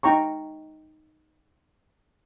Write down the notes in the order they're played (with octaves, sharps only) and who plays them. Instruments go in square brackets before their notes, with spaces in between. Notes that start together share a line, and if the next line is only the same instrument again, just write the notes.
[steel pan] D#4 G5 A#5 C#6